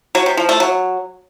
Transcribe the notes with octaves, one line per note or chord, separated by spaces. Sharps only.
F#3
C3
F3
A3
F#3